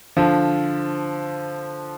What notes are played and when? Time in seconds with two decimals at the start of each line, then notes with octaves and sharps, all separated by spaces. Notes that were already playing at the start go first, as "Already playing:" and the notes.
0.16 D3 F3